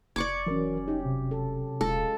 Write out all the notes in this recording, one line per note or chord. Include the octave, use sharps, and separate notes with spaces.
F1 D5 C#6 D6 G#6
E3 F#3 C#4 A#4
D#4 G4
C3
A4
D#1 G#3 F4 A4